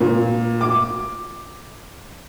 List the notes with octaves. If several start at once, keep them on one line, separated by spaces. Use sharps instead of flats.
A#2
D6